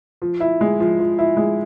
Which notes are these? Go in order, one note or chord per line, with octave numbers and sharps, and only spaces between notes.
F3
E4
G#3
F3
F3
E4
G#3